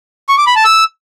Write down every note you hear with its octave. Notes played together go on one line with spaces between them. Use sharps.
C#6
D6
B5
A5
E6